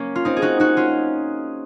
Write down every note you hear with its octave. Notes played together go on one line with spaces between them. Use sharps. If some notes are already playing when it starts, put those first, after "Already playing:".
Already playing: A#3 C#4
F4
C4 D#4
G#4
D#4 F#4
D#4 F#4
C#4 F4